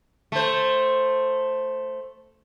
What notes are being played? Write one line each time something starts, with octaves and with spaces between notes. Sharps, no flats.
A3 C5